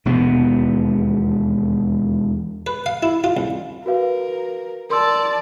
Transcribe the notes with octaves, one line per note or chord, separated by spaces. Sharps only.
E1 D#2 B2 B3
B4
F5
E4
F4
C2
F#4 A#4 B4 F5
A#4 D5 A5 C6 E6